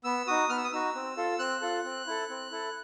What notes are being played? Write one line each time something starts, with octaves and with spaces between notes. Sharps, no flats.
B3 E6
D#4 F#4 D#6
B3 F6
E6
D#6
D#4 F#4 E6
C4
F4 A4
C4 F#6
F4 A4
C4
E4 A4
C4
E4 A4